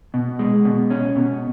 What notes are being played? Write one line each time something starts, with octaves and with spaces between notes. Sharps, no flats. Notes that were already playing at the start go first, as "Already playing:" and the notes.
B2
G#3
B2
C#4
B2